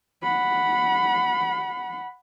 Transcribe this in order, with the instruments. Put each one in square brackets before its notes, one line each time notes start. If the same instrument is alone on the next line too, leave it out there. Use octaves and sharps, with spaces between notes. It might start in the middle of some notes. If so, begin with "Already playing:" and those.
[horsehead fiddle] F#5 B5